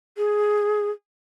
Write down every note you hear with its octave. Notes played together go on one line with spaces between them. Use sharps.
G#4